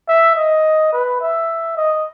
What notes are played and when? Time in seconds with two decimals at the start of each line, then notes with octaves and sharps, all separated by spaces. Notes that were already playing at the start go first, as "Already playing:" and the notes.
0.09 E5
0.36 D#5
0.93 B4
1.22 E5
1.77 D#5